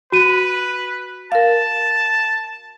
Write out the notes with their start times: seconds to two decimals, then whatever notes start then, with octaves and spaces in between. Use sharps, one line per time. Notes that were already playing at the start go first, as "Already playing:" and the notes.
0.12 F#4 B4 D#7
1.32 A#4 F5 A5